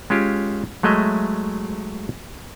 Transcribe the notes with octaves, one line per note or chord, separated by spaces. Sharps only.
G#3 C#4 F4 G4
F#3 G#3 A3 D#5 E5